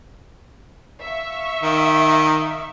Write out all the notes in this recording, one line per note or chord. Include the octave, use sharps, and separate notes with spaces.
E5 F5 C#6
D#3